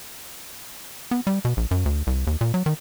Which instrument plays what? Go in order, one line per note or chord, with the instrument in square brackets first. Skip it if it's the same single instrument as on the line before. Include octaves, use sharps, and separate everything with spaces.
[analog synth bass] B3
G3
B2
A#1
F#2
D2
C2
D#2
A#2
F#3
D#3